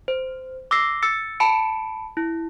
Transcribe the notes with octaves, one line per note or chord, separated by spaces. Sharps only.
C5
D6 E6 A#6 C7
E6 A6 C#7
A5 B5 C#7 D7
E4